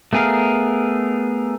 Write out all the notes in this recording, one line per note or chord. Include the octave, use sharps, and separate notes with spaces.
A3 B3 G#4 A#4 F5